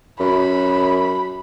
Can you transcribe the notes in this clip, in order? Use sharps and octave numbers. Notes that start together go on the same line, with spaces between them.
F#2 B5